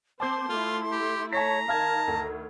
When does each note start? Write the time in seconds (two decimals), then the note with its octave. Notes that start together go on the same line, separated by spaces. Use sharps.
0.20 C4 C5 A5 C6 D6 G6
0.49 A3 E4 F4
0.91 G4
1.33 C#5 A5 A#5 C#6 B6
1.68 D#3 F5 A5 F6 G#6
2.08 D2